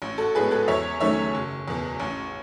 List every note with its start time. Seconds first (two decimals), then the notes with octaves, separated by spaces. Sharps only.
0.02 A1
0.18 F#4 A4
0.35 A2 G#3 B3 G#4 B4
0.51 F#4 A4
0.68 E2 C#5 E5
1.00 D#3 F#3 A3 C#4 C#5 E5
1.35 F#1
1.68 E2 B2
2.00 A1